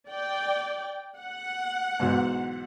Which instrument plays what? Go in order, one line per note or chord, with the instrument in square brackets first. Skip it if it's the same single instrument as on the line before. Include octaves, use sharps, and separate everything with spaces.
[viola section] D5 G5
F#5
[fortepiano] B1 E2 G#2